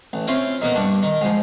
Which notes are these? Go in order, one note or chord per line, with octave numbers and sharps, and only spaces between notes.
A1
C4 C#4 E4 F4 C#5
D#3 A#3 B3
G2 D4 C#6
D#3
G#2 F3